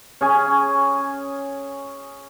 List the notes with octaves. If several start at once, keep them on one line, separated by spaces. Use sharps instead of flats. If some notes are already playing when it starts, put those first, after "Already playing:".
C#4 G#4 G#5